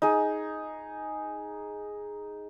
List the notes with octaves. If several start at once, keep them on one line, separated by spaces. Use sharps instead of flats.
D#4 G#4